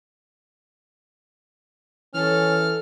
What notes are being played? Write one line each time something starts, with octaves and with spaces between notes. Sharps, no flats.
E3 C#4 A4 F6